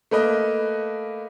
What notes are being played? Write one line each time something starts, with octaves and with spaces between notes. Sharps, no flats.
A3 A#3 B4 D#5